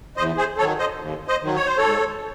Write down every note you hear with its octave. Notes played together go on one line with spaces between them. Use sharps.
E2 C5 D#5
G#4 C5
D#3 F#3 A4 C#5
C5 D#5
D#2
C5 D#5
D#3 F#3
C#5
C5
A4 C#5
G#2